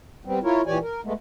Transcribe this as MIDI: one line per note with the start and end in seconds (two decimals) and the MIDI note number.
0.25 0.39 55
0.25 0.39 59
0.25 0.39 60
0.43 0.61 64
0.43 0.61 65
0.43 0.61 70
0.43 0.61 73
0.66 0.78 46
0.66 0.78 52
0.66 0.78 67
0.66 0.78 73
0.66 0.78 74
0.66 0.78 80
0.81 1.01 70
1.04 1.13 56
1.04 1.13 57
1.04 1.13 59